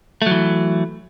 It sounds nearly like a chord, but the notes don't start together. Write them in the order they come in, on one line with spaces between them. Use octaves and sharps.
A3 F#3 E3